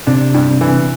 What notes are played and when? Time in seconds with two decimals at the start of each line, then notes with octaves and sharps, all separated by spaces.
0.07 C3 D4
0.34 G2
0.61 E3